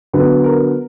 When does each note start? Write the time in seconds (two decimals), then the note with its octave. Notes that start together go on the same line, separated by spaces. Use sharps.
0.13 D3 F#3 B3 B4
0.44 A#4